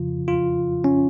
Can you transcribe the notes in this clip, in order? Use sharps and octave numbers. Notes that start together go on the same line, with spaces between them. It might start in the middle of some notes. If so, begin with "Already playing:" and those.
Already playing: F2 C#3 F3 F4
F4
C#4